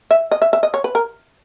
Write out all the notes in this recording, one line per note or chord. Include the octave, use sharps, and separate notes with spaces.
E5
D#5
E5
E5
D#5
C#5
B4
A#4